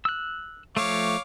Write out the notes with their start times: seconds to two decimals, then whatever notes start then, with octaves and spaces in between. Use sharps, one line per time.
0.05 E6 F#6
0.77 F3 A3 C#5 F5 D6